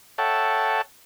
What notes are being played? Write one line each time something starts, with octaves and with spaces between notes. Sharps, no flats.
A4 C#5 E5 F#5 G5 A5